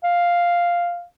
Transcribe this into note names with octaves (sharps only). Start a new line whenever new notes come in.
F5